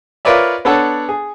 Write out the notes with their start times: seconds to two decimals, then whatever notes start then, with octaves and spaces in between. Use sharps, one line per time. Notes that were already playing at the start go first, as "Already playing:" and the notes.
0.25 F4 A#4 B4 C#5 D5 E5
0.65 B3 D4 A4 C#5 F#5 A5
1.09 G#4